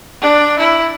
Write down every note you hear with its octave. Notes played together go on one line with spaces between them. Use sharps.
D4
E4